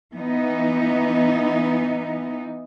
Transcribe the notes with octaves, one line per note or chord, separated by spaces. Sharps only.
E3 B3 D#4